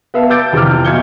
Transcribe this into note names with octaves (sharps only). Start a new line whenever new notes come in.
B3 B4 E5 F5 A5
D6 E6 G6 A6 D7
F2 C3 E3 D6 F6
B1 E5 F5 G#6 C#7 G7